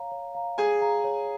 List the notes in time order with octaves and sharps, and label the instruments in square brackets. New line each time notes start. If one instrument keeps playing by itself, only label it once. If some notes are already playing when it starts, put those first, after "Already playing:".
Already playing: [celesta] C#5 F5 A#5
C#5
F5 A#5
[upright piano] G#4 G#5 [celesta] C#5
[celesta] F5 A#5
C#5